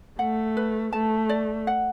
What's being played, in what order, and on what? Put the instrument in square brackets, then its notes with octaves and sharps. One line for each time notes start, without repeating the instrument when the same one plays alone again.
[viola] A3 [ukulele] F#5
[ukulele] B4
[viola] A3 [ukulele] A5
[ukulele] D5
F#5